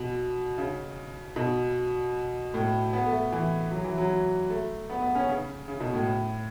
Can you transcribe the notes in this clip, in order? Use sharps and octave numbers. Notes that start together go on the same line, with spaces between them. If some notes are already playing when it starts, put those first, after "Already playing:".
Already playing: B2
C#3
B2
A2
B3
A3
E3
F#3
E3
F#3
A3
B3
B3
C#4
C#3
C#3
B2
A2